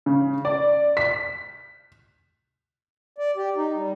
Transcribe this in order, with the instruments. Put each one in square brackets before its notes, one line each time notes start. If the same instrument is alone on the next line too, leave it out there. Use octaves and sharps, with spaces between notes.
[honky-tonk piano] C#3
D5
B6
[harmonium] D5
G4
D#4
G3